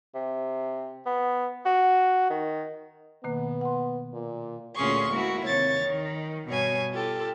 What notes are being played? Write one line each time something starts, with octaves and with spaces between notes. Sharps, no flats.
C3
B3
F#4
D#3
B2 D#3 A#3 B3
F#5 C6
A#2
D2 A#2 C#4 G#4 C6 C#6
G#3 A#3 E4 F#4
D#2 C3 C#5 A6
D#3
G2 B2 C#5 G#5
F4 G4 A4